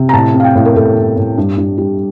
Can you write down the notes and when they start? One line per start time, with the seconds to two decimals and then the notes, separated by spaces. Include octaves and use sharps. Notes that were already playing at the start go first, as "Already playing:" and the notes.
Already playing: C3
0.09 A#5
0.13 A2 A5
0.34 C4
0.40 F5
0.44 G5
0.56 A2
0.65 A#4
0.76 A2 A4
0.96 C4
1.17 A2
1.38 G2
1.57 G2
1.78 G3